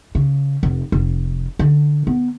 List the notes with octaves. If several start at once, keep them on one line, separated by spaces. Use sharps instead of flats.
C#3
F1
F1
D3
B3